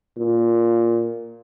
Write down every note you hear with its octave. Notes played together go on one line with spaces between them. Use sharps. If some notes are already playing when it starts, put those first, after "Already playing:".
A#2